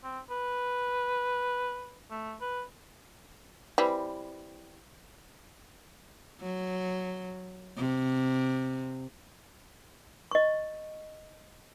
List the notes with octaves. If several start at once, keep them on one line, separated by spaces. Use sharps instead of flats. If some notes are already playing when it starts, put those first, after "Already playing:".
C4
B4
A3
B4
E3 G3 C4
F#3
C3
D#5 C#6